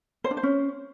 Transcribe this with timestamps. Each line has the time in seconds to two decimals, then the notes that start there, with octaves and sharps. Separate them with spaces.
0.24 C5
0.31 D4
0.37 C5
0.43 C#4